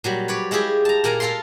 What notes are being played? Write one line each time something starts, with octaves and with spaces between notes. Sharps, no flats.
A#2 F#3 G3
B4 C#5 D5
G#3 E4 F4 G4 G#4
A5 A#5
A#2 A#3 A#4 G#5 A#5
F4 A4 F5 A#5 C6